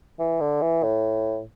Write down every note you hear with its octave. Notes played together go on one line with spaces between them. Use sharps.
E3
D3
E3
A2